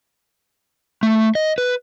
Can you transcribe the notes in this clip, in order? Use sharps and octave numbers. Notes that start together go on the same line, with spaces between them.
A3
D#5
B4